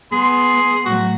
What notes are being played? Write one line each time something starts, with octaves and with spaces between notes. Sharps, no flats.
B3 G#4 C6
A2 F#3 F#4